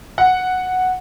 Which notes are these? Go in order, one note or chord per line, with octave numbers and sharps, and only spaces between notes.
F#5